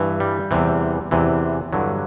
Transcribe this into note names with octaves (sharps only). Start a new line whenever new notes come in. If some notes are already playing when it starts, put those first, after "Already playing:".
Already playing: G2 E3
G3
E2 C3 E3
E2 C3 E3
G2 D3 F#3